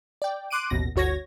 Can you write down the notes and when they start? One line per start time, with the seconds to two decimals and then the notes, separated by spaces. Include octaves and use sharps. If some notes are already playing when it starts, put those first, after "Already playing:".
0.22 D5 G5
0.51 C6 D6 F#6 D7 D#7
0.70 A1 D#2 B2 A#6
0.96 G1 D2 F#4 C#5 G#6 A#6